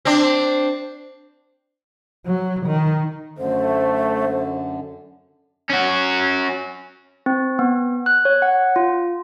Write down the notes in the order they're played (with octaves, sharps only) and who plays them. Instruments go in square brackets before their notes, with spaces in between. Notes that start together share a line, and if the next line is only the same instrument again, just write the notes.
[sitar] C4 D4
[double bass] F#3
D#3
[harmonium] F#2 D3 [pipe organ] A3 [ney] C5
[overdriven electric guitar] C#4 F#4
[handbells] C4
B3
F#6
C#5
F#5
F4